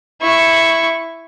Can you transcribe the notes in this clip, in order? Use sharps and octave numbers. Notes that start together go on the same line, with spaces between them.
E4 C#6